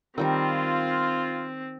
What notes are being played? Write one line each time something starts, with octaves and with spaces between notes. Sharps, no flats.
D#3 G3 C4 F4 A#4